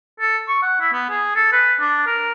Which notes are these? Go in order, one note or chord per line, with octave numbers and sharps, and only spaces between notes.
A4
C#6
F#5
E4
B3
G#4
A4
B4
D4
A#4